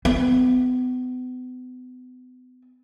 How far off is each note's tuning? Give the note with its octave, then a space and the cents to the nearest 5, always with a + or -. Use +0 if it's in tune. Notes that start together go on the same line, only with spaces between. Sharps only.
B3 +35